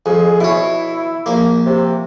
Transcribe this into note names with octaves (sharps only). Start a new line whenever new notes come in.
F2 G#4
B2 E4 C#5
A#1 A#3
C3